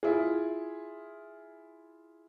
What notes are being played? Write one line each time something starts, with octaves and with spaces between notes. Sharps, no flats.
E4 F4 G#4